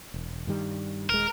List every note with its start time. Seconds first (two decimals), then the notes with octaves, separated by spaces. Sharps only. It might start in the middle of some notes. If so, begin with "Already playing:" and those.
0.14 E1
0.47 G2 D#3 G3
1.10 D#1 G#3 A#4